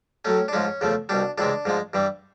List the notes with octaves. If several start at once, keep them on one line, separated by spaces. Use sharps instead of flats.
A2 F#3 A3 C#4
D4
G#2 F3 G#3 C#4
E2 C#3 F3 A3
C2 B2 G3 D4
C#2 C3 E3 G#3 D4
G#2 F3 G#3
G2 E3 G3